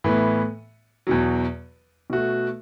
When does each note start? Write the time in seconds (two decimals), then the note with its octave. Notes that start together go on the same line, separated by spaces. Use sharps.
0.04 A2 E3 B3
1.07 E2 B2 F#3
2.10 B2 A3 F#4